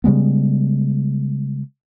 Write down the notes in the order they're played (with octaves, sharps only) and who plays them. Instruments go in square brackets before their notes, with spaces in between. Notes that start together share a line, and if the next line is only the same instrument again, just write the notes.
[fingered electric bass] C#3 G3 G#3 B3